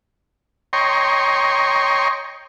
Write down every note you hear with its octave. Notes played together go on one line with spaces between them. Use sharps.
C#5 D#5 G5 A#5 C6 C#6